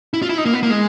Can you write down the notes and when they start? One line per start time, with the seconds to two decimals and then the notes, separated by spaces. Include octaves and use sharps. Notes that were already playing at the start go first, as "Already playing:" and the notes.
0.14 E4
0.22 F4
0.29 E4
0.38 D#4
0.45 A#3
0.54 B3
0.63 A#3
0.70 G#3